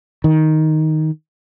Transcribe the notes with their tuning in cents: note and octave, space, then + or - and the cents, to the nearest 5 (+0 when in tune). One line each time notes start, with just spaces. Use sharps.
D#3 +5